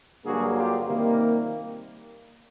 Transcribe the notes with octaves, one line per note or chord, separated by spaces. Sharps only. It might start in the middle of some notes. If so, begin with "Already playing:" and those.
G2 D3 F#3 A#3 F#4 G#4
F4 G4
C3 D#3 G3 A#3